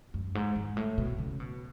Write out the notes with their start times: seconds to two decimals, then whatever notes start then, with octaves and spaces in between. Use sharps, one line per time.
0.14 F#2
0.35 G#2
0.56 G#2
0.77 A2
0.98 B2
1.18 C#3
1.40 B2